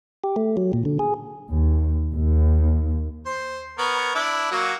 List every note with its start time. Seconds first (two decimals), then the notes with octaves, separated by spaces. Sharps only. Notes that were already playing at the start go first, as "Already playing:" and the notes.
0.24 G4
0.36 A3
0.57 F#3
0.73 A#2
0.85 D3
0.99 G#4
1.48 D#2
2.14 D#2
3.26 C5
3.78 B3 A#4 C#5
4.15 D4 E4 D6
4.52 F#3 A#3 F#4